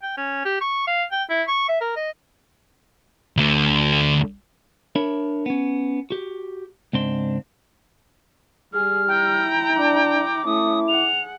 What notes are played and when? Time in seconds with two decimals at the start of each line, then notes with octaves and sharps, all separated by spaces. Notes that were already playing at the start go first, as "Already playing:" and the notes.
0.02 G5
0.17 C#4
0.45 G4
0.61 C#6
0.87 F5
1.12 G5
1.30 E4
1.48 C#6
1.69 E5
1.81 A#4
1.96 D#5
3.37 D2 A3
4.96 D4 A#4 C#5 E5 B5
5.46 B3 C#4
6.10 F#4 G4
6.93 C#2 G#2 C4 D4 C6
8.74 G3 G#4 F6
9.08 E4 G5 A#5
9.77 D4 D6
10.46 A3 C#4 E4 D#6
10.88 G#4 F#5 F7